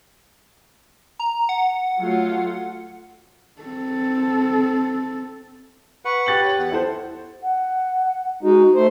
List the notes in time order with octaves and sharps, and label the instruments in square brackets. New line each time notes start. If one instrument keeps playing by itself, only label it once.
[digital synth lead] A#5
F#5
[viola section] F#3 A3 F4
[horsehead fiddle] C4 A4
[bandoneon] B4 F#5 [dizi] C#6
[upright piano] G4 A6 F#7
[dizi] C#5
[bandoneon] E2 [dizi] F#5
[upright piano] E4 A4 C5
[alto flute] F#5
[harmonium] G#3 D#4 [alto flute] F#4
[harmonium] A3 C5